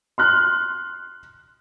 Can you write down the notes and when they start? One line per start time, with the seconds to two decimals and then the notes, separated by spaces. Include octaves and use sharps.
0.18 C6 F6 F#6